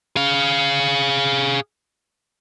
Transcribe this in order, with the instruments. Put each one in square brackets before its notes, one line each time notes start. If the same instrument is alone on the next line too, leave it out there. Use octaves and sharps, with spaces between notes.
[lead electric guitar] G#4 F5